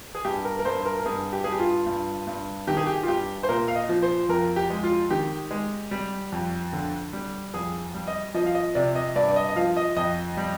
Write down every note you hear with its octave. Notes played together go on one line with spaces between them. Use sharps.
G#4
G2 G4
A#4
A#4
G2 C5
A#4
A#4
G2 G#4
G4
G2 G#4
G4
F4
G2
G2
D#3 G4
G#4
G4
F4
G2 G4
C5
A#2 A#4
F5
D#5
F3
C5
F2 A#4
G4
G#3
F4
D#3 G4
G#3
G3
F2
D3
G3
F2 G#4
G3
D#5
F3 D#5
F5
D#5
C3 D5
D#5
G2 D5
D5
D#5
D#5
F3 F5
D#5
F2 D#5
G3